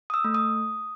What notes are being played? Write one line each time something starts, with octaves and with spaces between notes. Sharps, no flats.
D#6
E6
A3
D#6